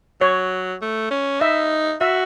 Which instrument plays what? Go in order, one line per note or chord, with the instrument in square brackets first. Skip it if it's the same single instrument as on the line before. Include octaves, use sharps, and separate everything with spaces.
[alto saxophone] F#3 [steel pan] C#5
[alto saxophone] A3
C#4
[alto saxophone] D#4 [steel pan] E5
[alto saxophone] F#4 [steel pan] E5